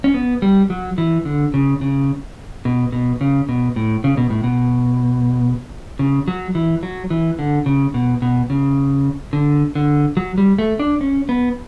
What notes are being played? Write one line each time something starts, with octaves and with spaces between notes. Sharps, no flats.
C#4
B3
G3
F#3
E3
D3
C#3
C#3
B2
B2
C#3
B2
A2
C#3
B2
A2
B2
C#3
F#3
E3
F#3
E3
D3
C#3
B2
B2
C#3
D3
D3
F#3
G3
A3
D4
C#4
B3